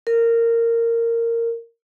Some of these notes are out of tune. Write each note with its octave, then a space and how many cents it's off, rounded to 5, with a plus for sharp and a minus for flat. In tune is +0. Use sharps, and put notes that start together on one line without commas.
A#4 -15